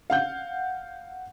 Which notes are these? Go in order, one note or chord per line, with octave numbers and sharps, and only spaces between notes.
F5 F#5 G6